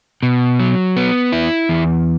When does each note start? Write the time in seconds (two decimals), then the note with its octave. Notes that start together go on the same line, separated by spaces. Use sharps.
0.23 B2
0.60 F#3
0.97 B3
1.32 E4
1.69 E2